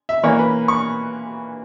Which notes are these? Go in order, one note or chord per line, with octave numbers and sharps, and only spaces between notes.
E5
E3 A#3 C#4 C#5
B4
C#6